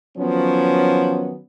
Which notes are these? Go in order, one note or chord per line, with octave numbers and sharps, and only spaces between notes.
D#3 F3 F#3 B3 C#4